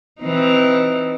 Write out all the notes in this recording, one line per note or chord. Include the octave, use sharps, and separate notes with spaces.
E3 C4 D#4